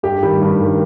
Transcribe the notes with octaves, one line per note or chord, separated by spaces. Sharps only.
G2 G4
D#3 G3
G2
D#3 G3